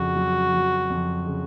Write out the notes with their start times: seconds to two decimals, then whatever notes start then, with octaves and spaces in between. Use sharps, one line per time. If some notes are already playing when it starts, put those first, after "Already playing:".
Already playing: F2 C#3 F#4
0.16 F#3
0.54 F#3
0.90 F2
1.26 C#3